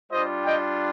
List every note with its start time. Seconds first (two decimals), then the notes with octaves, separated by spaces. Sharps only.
0.12 G3 D4 F4 C5 D#5
0.45 D#5 G5